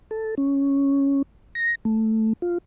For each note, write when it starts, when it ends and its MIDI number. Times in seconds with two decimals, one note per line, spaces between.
0.11 0.35 69
0.38 1.22 61
1.55 1.75 94
1.85 2.33 57
2.42 2.58 65